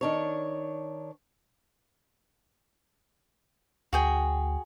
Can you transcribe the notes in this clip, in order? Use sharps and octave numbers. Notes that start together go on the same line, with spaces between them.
D#3 D4 C#5
D2 F#4 G#4 G5